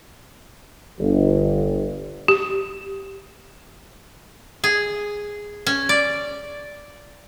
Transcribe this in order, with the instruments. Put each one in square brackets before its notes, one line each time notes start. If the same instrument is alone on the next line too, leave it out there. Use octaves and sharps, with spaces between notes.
[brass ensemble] G1
[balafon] G4
[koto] G#4
C#4
D5